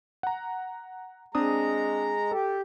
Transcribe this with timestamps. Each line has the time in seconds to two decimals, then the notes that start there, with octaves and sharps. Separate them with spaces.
0.23 F#5 A#5
1.35 G#3 C4 D4 A#5 D#6
2.32 G4 A4